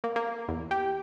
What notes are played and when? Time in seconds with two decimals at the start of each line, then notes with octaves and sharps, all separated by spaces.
0.04 A#3
0.16 A#3
0.48 E2
0.71 G4